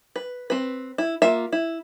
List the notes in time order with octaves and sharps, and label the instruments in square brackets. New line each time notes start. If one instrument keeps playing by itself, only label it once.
[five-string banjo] B4
C4 B4
E4
A#3 F4 E5
E4